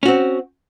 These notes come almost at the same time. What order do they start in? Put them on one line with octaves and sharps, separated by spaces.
C#4 F#4 C4